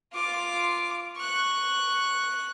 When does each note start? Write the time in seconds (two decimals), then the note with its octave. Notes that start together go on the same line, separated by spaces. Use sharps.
0.12 F4 D6
1.17 C#6 F#6